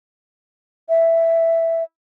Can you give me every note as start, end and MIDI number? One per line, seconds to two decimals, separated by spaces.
0.89 1.83 76